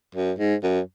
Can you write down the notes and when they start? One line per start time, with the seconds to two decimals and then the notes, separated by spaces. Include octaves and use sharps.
0.15 F#2
0.38 G#2
0.63 F#2